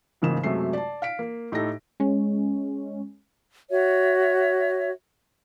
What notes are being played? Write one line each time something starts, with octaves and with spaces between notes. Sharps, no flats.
A1 G#2 C#3 A#3 E7
F#2 C3 F#3 G#3 A3 C7
D5 A5
F5 B6 D7
A#3
A2 D#4 G4 A4 A#6
G#3 C#4
F#4 C#5 E5